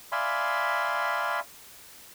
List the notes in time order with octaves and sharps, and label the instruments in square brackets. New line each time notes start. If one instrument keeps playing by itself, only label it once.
[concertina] D5 E5 F5 G#5 B5 C6